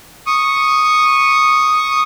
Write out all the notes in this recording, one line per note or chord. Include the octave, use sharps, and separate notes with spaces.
C#6 D#6